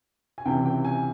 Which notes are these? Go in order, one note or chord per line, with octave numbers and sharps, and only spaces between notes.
G#5
C#2 C3 E3 G5
G5
G#5